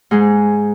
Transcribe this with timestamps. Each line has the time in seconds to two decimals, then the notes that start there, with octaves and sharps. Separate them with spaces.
0.11 G#2 G#3 G#4